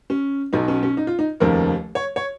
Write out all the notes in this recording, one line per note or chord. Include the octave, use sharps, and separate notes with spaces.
C#4
B1 B2 F#3 D#4
C#4
C#4
D#4
F4
D#4
F1 D#2 C#3 F3 A#4
C#5
C#5